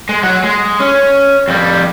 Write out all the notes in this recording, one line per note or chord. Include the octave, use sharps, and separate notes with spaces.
G#3
F#3 F#5
G#3
C#4
F2 G3